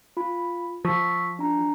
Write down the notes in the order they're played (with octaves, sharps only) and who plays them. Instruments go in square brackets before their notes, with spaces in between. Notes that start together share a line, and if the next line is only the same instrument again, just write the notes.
[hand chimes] F4 B5
[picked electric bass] F3 [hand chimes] C#6 E6 B6
[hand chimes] D4 A#5